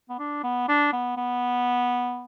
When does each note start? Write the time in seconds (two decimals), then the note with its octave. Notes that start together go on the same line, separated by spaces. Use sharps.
0.09 B3
0.19 D4
0.43 B3
0.68 D4
0.93 B3
1.17 B3